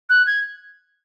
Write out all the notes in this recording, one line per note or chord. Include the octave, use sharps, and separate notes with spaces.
F#6
G#6